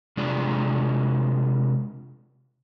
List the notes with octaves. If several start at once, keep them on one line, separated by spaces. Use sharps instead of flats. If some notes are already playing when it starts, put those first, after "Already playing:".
C3 G#3 D4 F4 G#4 D5